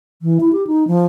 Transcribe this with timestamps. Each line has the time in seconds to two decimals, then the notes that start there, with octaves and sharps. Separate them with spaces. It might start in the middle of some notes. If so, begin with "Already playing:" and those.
0.22 E3
0.41 E4
0.53 G4
0.67 D#4
0.87 F3